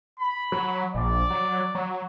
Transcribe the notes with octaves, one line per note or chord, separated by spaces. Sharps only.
B5
F#3
A#1 D5
F#3
F#3